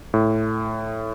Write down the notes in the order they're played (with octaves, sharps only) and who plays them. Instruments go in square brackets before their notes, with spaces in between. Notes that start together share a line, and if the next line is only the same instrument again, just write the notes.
[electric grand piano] A2